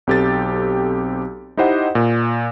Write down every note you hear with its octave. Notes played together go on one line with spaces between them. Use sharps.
B1 C4 G4 A4 A6
D#4 E4 G4 C5 D#5 F#5
A#2